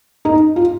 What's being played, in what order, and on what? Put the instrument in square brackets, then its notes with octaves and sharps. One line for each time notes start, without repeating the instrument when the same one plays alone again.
[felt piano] D#4
F4